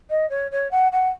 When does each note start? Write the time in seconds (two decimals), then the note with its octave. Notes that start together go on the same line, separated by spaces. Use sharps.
0.10 D#5
0.30 C#5
0.51 C#5
0.71 F#5
0.92 F#5